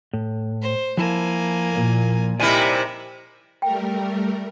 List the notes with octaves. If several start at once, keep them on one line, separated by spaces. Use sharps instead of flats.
A2
C5
F3 A#3 E4 G#5 A5
A#2
C3 G3 D#4 E4 A#4 D5 G#5
G3 A3 A#4 G5